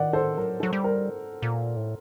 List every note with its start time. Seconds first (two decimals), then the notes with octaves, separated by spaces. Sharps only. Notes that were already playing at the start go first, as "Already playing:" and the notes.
Already playing: D#3 D5 F#5
0.13 A4 C5
0.37 F#3 A#4
0.60 F#3 A4
0.73 G3
0.84 A#4
1.42 A#2
1.77 A2